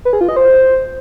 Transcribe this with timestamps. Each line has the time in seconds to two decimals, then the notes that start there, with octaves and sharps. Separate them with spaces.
0.05 B4
0.13 G#4
0.21 F4
0.29 D#5
0.36 C5